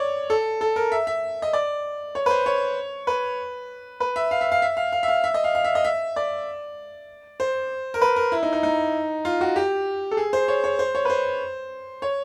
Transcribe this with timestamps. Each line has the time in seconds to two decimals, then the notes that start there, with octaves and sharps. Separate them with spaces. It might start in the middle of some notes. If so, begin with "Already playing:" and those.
Already playing: C#5 D5
0.30 A4
0.61 A4
0.76 A#4
0.92 E5
1.07 E5
1.42 D#5
1.53 D5
2.15 C#5
2.26 B4
2.30 C5
2.46 C#5
3.07 B4
4.00 B4
4.16 E5
4.31 F5
4.41 E5
4.52 F5
4.62 E5
4.77 F5
4.92 F5
5.03 E5
5.08 F5
5.24 E5
5.34 D#5
5.44 F5
5.55 F5
5.64 E5
5.75 D#5
5.85 E5
6.16 D5
7.40 C5
7.94 A#4
8.01 B4
8.16 A#4
8.32 E4
8.43 D#4
8.53 D#4
8.63 D#4
9.25 F4
9.41 F#4
9.56 G4
10.11 A4
10.17 G#4
10.33 C5
10.48 C#5
10.64 C#5
10.79 C5
10.95 C#5
11.05 B4
11.10 C5
12.02 C#5